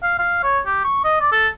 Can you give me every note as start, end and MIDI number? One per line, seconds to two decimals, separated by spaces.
0.03 0.15 77
0.19 0.42 77
0.43 0.60 73
0.66 0.80 67
0.84 1.03 85
1.04 1.19 75
1.20 1.31 74
1.32 1.48 69